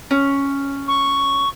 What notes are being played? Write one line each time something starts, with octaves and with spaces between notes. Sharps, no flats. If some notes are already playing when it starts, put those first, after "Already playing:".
C#4
C#6